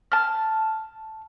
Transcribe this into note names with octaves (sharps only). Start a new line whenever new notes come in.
A5 F6